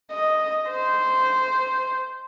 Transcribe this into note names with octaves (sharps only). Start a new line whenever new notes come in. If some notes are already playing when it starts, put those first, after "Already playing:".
D#5
C5